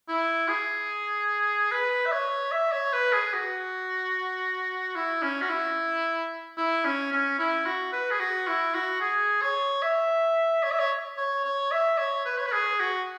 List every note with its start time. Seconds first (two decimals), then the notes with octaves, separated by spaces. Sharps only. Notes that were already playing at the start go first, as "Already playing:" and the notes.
0.08 E4
0.48 G#4
1.71 B4
2.06 E5
2.12 C#5
2.51 E5
2.72 C#5
2.93 B4
3.13 G#4
3.33 F#4
4.95 E4
5.22 C#4
5.41 F#4
5.49 E4
6.57 E4
6.84 C#4
7.12 C#4
7.39 E4
7.66 F#4
7.93 B4
8.11 G#4
8.20 F#4
8.47 E4
8.74 F#4
9.01 G#4
9.42 C#5
9.82 E5
10.63 C#5
10.71 E5
10.79 C#5
11.17 C#5
11.44 C#5
11.71 E5
11.98 C#5
12.26 B4
12.37 C#5
12.46 B4
12.52 G#4
12.80 F#4